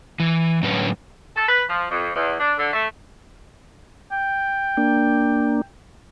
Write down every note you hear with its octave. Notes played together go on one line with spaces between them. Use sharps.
E3
A2 D3 F#3 C#4 B4
A4
B4
F3
F2
E2
D4
D3
A3
G5
A#3 D4